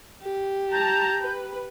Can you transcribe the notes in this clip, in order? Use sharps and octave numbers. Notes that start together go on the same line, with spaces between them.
G4
A5 A#5 G6
B4